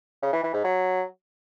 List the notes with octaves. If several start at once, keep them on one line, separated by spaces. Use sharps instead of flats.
C#3
E3
E3
G#2
F#3